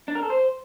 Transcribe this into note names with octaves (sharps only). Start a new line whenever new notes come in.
D4
A#4
A4
C5